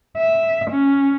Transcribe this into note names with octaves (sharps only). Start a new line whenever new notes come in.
E5
C#4